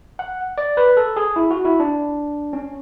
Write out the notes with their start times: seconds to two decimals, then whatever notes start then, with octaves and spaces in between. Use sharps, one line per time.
0.19 F#5
0.58 D5
0.77 B4
0.97 A4
1.17 G#4
1.36 E4
1.51 F#4
1.65 E4
1.80 D4
2.53 C#4